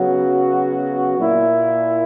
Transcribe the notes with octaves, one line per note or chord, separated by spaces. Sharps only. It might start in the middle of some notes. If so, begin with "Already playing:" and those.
Already playing: C#3 F#3 B3 F#4
A#2 A#3 E4